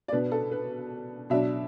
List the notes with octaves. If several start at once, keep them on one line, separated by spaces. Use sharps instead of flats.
D5
B2 B3 D4 B4
A4
B4
B2 F#3 D4 E5